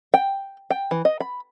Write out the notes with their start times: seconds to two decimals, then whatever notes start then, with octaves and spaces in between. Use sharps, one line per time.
0.14 G5
0.70 G5
0.91 E3
1.05 D#5
1.20 B5